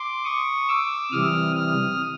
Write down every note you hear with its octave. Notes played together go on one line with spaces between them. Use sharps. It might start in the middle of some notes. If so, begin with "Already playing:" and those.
Already playing: C6 D6
C#6 D#6
D6 E6
C3 E3 G3 D#6 F6
D#6 F6